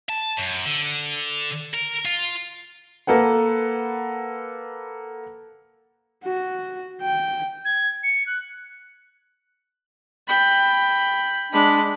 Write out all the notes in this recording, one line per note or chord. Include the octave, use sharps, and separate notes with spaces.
A5
F#2
D3
A#4
F4
A#3 A4 B4 F#5
F#4
G5
G#6
C#7
F#6
G5 B5
G#3 D4 B5